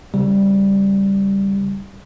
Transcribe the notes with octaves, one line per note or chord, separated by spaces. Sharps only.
C#3 G3